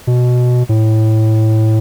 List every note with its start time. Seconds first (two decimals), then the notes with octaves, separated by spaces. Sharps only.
0.07 B2
0.69 A2